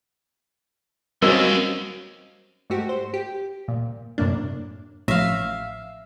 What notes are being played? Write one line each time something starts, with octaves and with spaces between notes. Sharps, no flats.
D#2 F#3 G3 C4 C#4 A#4 D#5
G#2 A3 F#4 G4
C5
G4
A#2
F#2 A2 C3 A#3 D4
A1 F3 E5 F5